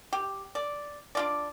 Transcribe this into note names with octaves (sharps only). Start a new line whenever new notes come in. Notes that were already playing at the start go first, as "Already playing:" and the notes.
G4
D5
D4 F4 D5